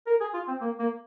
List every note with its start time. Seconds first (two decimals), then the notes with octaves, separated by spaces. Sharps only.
0.07 A#4
0.20 G#4
0.33 F4
0.48 C4
0.61 A#3
0.79 A#3